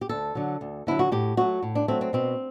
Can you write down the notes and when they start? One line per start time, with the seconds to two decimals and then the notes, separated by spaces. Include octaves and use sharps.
0.01 G4
0.09 D2 A4
0.35 D3 F#3
0.61 D2
0.87 D3 F#3 E4
0.99 F#4
1.12 A2 G4
1.37 F#3 A3 F#4
1.63 A2
1.75 D4
1.88 F#3 A3 C4
2.01 C4
2.13 B2 C4